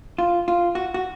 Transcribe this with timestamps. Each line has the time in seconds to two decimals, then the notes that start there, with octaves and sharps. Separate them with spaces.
0.18 F4
0.48 F4
0.75 F#4
0.94 F#4